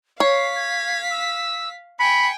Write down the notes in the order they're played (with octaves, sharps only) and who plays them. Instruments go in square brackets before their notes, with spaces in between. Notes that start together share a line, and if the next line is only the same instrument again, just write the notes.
[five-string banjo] C#5 [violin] F5 B6 [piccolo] C7
[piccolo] G#6
E6
[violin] G5 G#5 [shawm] B5 [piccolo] C#7